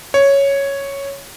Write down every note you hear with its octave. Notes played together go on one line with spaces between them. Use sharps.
C#5